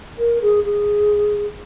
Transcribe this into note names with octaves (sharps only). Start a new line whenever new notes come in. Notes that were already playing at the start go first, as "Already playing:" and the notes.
A#4
G#4
G#4